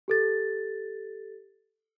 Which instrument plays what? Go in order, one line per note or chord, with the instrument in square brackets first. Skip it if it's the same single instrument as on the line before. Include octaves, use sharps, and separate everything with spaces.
[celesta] G4 A4 A6